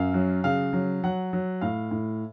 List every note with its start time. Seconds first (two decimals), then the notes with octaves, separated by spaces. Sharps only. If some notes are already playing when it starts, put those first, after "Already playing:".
Already playing: F#2 F5
0.14 F#3
0.44 C#3 F5
0.73 F#3
1.04 F#3 F#5
1.33 F#3
1.61 A2 F5
1.91 A2